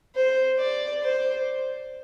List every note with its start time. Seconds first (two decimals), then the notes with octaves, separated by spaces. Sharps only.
0.16 C5
0.59 D5
1.03 C5